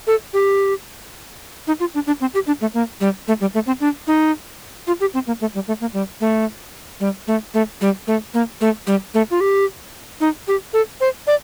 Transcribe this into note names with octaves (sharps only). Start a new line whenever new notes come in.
A4
G4
D#4
F4
D4
D4
C4
G4
D4
A3
A#3
G3
A3
G3
A3
C4
D4
D#4
F4
G4
C4
A#3
A3
G3
A3
A#3
G3
A3
G3
A3
A3
G3
A3
A#3
A3
G3
A3
F4
G4
D#4
G4
A4
C5
D5